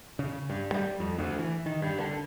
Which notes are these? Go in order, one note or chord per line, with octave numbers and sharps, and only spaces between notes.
C#3
G2
G3
F2
D2
E3
D#3
G2
D3